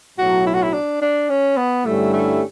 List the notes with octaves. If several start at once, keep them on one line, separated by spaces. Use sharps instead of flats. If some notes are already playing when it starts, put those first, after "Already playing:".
B1 A2 F#3 F#4
E4
F#4
E4
D4
D4
C#4
B3
G2 D3 G3 A3 C#4 E4
A3